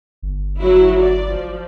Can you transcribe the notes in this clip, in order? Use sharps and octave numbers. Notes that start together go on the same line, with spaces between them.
G1
F#3 E4
D5
F3